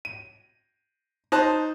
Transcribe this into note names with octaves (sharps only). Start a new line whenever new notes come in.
D#7
D#4 C5 A5 F#6